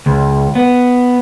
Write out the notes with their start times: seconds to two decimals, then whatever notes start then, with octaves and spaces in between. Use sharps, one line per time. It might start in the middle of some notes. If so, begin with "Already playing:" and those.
0.06 C#2
0.55 B3